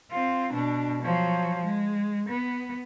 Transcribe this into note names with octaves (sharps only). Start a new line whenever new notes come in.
C4 F4
B2 D4
F3 F#3
G#3
B3